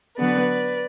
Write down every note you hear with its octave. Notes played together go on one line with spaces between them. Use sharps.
D3 F#3 B3 B4 D5